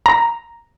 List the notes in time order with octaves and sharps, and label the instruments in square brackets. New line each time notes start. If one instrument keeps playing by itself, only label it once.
[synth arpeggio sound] A#5